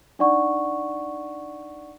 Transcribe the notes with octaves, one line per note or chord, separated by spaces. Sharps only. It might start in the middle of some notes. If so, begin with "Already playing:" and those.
D4 D#4 D5 F#5 C#6